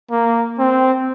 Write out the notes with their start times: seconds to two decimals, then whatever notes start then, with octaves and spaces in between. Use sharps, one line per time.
0.11 A#3
0.59 C4